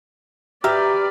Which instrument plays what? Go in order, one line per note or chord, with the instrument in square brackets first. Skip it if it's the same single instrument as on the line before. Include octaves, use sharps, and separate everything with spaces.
[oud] G4 [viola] B4 D5 [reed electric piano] E5 A#5 F6